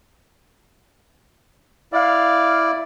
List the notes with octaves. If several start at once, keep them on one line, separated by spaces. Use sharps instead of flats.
E4 D5 F5